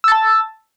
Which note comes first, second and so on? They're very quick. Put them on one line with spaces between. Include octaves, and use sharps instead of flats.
E6 A6 A5